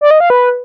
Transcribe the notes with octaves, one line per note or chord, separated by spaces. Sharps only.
D5
D#5
F5
B4